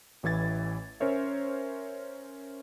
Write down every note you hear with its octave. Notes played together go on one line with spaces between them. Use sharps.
A1 A2 E3 E4 G#6 A6
C#4 A#4 C5 C#5 E5